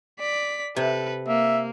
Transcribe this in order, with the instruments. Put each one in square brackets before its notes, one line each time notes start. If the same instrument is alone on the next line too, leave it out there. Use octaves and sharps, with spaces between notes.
[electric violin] D5 B6
[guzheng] C3 [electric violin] A4 B4
[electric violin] A#3 [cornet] E5